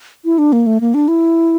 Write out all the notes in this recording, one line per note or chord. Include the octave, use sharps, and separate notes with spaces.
E4
D4
A#3
A3
A#3
D4
E4